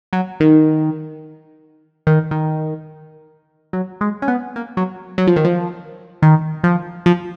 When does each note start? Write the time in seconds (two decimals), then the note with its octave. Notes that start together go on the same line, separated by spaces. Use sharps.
0.13 F#3
0.40 D#3
2.07 D#3
2.31 D#3
3.73 F#3
4.01 G#3
4.22 C#4
4.28 B3
4.56 A#3
4.77 F#3
5.18 F#3
5.27 F3
5.36 D#3
5.44 F3
6.22 D#3
6.64 F3
7.06 F3